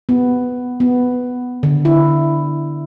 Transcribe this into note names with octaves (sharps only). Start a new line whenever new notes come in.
B3
B3
D3
E4